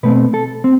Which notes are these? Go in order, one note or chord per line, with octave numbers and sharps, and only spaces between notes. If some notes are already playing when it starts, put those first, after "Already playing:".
B2 A3 C4 B4
A4
C4